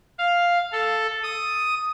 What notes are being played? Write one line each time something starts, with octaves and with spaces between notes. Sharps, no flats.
F5
A4
D#6